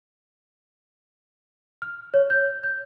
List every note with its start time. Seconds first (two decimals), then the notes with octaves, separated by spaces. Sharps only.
1.82 F6
2.14 C#5
2.30 G6
2.63 G6